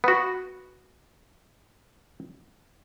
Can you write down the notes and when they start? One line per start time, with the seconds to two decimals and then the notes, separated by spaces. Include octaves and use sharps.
0.04 B3 F#4